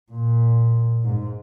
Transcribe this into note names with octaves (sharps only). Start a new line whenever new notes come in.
A#2
G#2